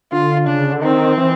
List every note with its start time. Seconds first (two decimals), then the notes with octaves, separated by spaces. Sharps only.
0.12 D3 F4
0.47 C#3 D4
0.72 D3
0.82 D#3 C4
1.17 E3